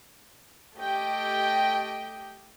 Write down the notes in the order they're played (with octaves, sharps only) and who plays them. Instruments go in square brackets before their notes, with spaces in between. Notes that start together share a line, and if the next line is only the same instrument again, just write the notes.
[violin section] A3 G4 D#5 G5